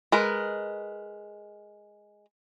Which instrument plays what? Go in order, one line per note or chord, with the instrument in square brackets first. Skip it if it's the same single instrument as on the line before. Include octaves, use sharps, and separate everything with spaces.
[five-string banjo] G#3 A#4 B4